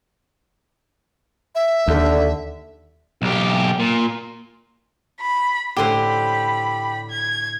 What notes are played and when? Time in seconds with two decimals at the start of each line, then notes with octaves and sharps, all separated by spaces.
1.55 E5
1.88 D#2 D3
3.22 B1 G4
3.79 A#2
5.21 B5
5.77 A2 D3 G4 C5 B5 C6
7.10 G#6